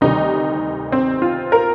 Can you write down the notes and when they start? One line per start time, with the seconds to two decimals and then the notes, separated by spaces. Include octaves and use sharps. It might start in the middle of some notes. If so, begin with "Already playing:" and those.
0.01 D2 C3 D#3 G3 D#4
0.92 C4
1.22 F4
1.52 A#4